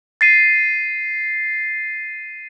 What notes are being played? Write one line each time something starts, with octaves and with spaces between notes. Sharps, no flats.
A6 C7 D#7